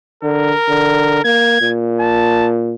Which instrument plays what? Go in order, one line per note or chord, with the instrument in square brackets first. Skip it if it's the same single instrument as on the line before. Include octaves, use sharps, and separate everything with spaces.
[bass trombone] D3 [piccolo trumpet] A#4
[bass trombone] D3
[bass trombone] A#3 [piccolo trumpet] G#6
[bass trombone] A#2
[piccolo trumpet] A5